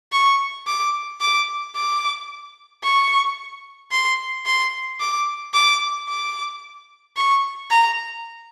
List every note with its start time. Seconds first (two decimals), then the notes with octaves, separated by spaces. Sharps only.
0.12 C#6
0.67 D6
1.21 D6
1.75 D6
2.84 C#6
3.92 C6
4.46 C6
5.00 D6
5.54 D6
6.08 D6
7.17 C#6
7.70 A#5